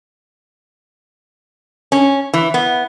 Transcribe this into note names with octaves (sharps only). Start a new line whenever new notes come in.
C#4
E3
B3